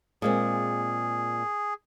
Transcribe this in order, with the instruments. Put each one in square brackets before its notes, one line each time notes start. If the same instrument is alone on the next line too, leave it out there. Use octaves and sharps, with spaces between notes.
[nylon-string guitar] A#2 G#3 C4 [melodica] G#4